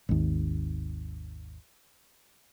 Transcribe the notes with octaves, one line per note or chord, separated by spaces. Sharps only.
G#1 D#2